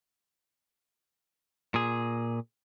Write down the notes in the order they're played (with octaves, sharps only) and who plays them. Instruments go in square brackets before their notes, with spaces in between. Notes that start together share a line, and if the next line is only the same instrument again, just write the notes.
[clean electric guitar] A#2 G#4